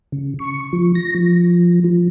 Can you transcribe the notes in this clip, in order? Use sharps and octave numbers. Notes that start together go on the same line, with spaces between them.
C#3
C#6
F3
A#6
F3
F3